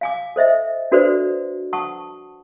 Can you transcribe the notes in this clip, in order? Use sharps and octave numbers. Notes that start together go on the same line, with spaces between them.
F5 G#5 D6
A4 C5 D#5 E5
D4 F#4 A4 B4 C5 D5
F#5 A5 C#6 D#6